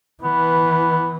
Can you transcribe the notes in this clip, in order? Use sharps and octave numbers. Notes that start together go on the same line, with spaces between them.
E3 B3